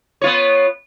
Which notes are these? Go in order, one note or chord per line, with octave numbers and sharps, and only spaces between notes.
B3 F4 C#5